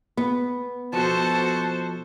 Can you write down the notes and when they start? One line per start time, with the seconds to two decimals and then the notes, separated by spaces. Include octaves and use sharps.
0.17 B3
0.93 B2 F3 F#4 A4 C5 A5